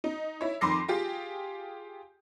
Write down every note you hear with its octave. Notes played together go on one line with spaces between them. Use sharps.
D#4
E4 C#5
F2 D#3 C6 D6 A#6 C7
F4 G4 G#4